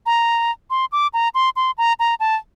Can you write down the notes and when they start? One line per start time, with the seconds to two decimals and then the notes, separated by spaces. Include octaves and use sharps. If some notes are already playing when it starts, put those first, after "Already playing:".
0.06 A#5
0.70 C6
0.92 D6
1.14 A#5
1.35 C6
1.56 C6
1.78 A#5
2.00 A#5
2.20 A5